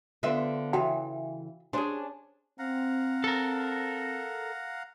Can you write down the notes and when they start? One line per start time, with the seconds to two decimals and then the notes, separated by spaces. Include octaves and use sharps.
0.23 D3 B3 C4 F4 E5
0.73 C#3 E3 F#4 F5 G5
1.73 C#4 D4 G#4 C5
2.59 C4 F5 F#5 A#5
3.24 A4 A#4